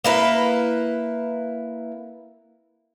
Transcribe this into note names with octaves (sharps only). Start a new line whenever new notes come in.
A#3 E4 B4